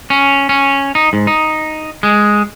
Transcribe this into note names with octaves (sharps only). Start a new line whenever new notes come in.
C#4
C#4
D#4
G#2
D#4
G#3